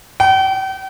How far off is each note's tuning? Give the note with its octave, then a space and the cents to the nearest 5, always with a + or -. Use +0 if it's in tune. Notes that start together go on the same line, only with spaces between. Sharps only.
G5 -40